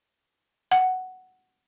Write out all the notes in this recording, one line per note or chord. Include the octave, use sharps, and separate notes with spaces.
F#5